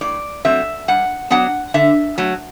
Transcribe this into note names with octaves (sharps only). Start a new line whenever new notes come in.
A2 D5
F#3 A3 C4 E5
G2 F#5
F#3 B3 D4 F#5
D3 E5
F#3 A3